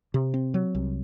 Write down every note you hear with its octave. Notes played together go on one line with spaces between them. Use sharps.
C3
C4
F#3
C2